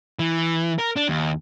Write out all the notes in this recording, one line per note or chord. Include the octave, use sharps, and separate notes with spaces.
E3
A#4
D4
D#2